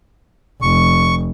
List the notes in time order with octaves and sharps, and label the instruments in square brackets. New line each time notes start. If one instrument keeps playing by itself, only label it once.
[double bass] F1 [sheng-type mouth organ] C#6